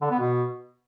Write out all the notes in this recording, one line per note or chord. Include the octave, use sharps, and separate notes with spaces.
D3
B3
B2